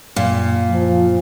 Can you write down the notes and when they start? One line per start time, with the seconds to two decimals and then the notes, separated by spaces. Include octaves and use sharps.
0.16 F#2 A#2 F5
0.71 F3